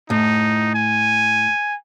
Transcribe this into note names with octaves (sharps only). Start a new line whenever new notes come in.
A2 D#4
G#5